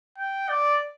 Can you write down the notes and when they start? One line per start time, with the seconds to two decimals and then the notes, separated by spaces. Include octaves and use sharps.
0.17 G5
0.49 D5